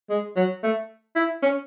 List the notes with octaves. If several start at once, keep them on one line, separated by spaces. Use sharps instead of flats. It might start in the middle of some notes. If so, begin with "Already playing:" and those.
G#3
F#3
A3
E4
C#4